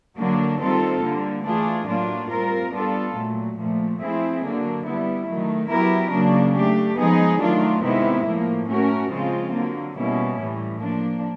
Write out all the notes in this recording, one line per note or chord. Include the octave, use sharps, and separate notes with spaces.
D3 F#3 A#3 D4
D#3 G3 C4 F4 A4
D3 G3 A#3
E3 A3 D4 F4 G#4
A2 F#3 A#3 D4 F4
G3 C4 F4 A#4
G3 B3 D4 F4 A4
A#2 F#3 A3
A#2 F3 A3
F3 A3 C4 E4 G#4
D3 F#3 A#3 D4
G3 B3 E4
D#3 F#3 A3
F#3 B3 E4 G4 A#4
C#3 F#3 A#3 D4
A3 D4 G4
F3 G#3 B3 D#4 G#4
D#3 F#3 A3 D4 F4
C3 D#3 G#3 B3 E4
A2 F3 A#3
A3 C#4 F#4 A#4
C#3 F3 G#3 C4 F4
D3 F#3 A#3
B2 G3 A#3 C#4 E4
A2 E3 G3
F3 A#3 D4